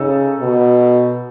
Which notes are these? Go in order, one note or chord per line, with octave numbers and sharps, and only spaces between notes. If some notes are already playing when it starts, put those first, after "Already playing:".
Already playing: C#3 D#4 A4
B2